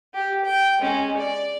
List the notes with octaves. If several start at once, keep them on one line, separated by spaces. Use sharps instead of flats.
G4
G5
G#3 C#4
D5